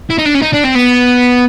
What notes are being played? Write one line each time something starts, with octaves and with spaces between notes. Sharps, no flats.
E4
D#4
D4
C#4
D#4
D4
C4
B3